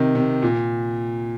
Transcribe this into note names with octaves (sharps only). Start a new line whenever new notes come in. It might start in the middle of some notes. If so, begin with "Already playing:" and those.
Already playing: C3 D#3
C3
A#2